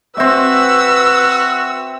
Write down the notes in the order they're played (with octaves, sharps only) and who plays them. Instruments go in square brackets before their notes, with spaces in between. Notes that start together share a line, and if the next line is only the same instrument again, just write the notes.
[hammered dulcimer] C4 E5 [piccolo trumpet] F#4 [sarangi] B4 [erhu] E6